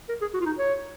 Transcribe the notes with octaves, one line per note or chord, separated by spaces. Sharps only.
A#4
G#4
F#4
F4
D#4
C#5